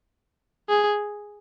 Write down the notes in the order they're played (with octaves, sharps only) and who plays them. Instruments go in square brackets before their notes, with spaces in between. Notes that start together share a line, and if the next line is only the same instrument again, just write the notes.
[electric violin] G#4